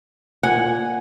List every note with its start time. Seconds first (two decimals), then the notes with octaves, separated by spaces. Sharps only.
0.43 A#2 F#5 G#5